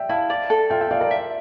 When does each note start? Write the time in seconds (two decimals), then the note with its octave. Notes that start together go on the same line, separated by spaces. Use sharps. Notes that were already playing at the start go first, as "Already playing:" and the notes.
Already playing: D5 E5 G5
0.09 E4 F5 A5
0.30 D5
0.50 A4
0.70 F4 E5 G5
0.81 E5 G5
0.91 F4 D5 F5
1.01 A#4 D5
1.11 E5